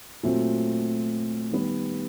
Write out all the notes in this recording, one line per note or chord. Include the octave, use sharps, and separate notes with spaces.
A#2 F#3 A3 C4
D#3 G3 B3